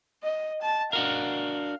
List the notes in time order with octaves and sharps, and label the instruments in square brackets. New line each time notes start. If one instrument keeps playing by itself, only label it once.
[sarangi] D#5
A5
[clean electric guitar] D4 F#4 A#4 [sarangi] F5